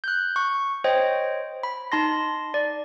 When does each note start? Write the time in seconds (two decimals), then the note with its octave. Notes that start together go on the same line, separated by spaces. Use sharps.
0.04 F#6 G6
0.36 C#6
0.84 C5 C#5 D#5 G5
1.63 B5
1.92 D#4 A5 C6 A#6
2.54 D5